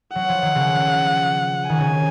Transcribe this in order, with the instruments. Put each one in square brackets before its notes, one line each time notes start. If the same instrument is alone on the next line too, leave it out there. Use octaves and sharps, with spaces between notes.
[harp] F#3 [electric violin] F#5
[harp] F3
D#3
C#3 F3
[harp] D#3 [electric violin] G#5
[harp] C#3